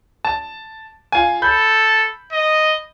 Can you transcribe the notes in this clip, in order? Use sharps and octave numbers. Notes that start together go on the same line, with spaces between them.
A5
F4 G#5
A4 B5 G6
D#5